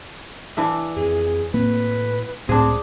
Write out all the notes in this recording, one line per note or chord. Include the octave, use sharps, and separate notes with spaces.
E3 D4 E5
F2 G#4
A2 A#3 C4 B4
C#2 A2 C4 D4 G#4